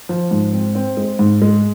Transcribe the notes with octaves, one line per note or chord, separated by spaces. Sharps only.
F3
G#2
C4
C4
G#3
G#2
G#3